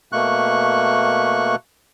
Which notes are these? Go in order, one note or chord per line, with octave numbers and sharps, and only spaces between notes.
B2 A3 A#3 C#6 F#6